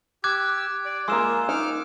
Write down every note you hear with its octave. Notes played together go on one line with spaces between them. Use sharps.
G4 D6 E6 F#6 G#6
D5
G#3 A#3 F4 C6 E6 E7
D#4 D6 F6